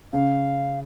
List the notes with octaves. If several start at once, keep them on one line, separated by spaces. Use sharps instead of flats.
C#3 F5